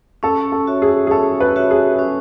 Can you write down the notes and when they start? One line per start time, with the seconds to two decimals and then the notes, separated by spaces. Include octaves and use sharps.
0.23 C#4 A4
0.52 A4
0.67 F#4 C#5 E5
0.82 G#4
1.07 G#4
1.11 C#4 A4
1.40 B4
1.56 F#4 C#5 E5
1.71 G#4
1.99 C#4